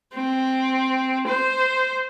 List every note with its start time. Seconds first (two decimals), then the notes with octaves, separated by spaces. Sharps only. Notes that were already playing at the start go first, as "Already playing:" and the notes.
0.15 C4
1.28 C5